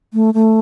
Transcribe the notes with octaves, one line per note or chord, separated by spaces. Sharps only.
A3
A3